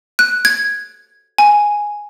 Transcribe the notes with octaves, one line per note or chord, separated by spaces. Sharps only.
F#6
G#6
G#5